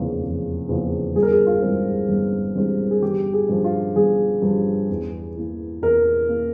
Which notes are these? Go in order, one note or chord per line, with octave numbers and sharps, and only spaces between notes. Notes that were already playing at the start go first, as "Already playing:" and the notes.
Already playing: F1 E2 C#3 F3 A#3
F1
E2 C#3 F3 A#3
G1 G#4
A#4
G#4
F4
G2 E3 G#3 C4
G1
G2 E3 G#3 C4
G#4
G1 G4
G#4
G2 F3
F4
G1 G#4
G2 F3
E2
E3 A#3
E2 A#4
E3 A#3